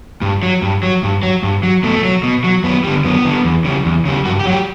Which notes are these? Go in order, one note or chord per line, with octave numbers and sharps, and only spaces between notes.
G2
F#3
G2
F#3
G2
F#3
G2
F#3
B2 A3
F#3
B2
F#3
F#2 B3
D3 G3
F#2 B3
D3 G3
E2
C#3 G3
E2
C#3 G3
G2 F#4
G4
F#3 F#4
G4